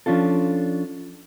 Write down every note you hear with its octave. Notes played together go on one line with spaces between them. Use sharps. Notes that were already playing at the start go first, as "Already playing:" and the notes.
F3 C#4 D4 F4 A4